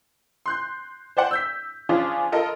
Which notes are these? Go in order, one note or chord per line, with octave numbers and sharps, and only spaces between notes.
C6 F#6 G6
C5 D5 F#5
E6 G6 B6
F3 C#4 D4 F4 G#4
F4 A4 A#4 D#5